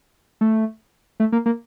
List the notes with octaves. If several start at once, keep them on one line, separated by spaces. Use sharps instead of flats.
A3
A3
A#3
A#3